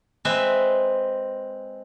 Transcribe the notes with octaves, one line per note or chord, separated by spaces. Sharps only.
G#3 C4 B4 E5